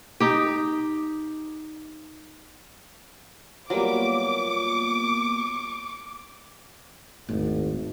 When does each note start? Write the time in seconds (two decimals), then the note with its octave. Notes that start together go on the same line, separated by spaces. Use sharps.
0.20 D#4 G4
3.70 F#3 G3 A#3 B3 F4 D6
7.29 D#1 G#1 A2